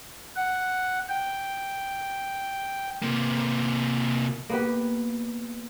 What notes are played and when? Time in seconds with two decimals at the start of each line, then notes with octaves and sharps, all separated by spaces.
0.36 F#5
1.09 G5
3.02 C3 A#3
4.49 A#3 B3 G4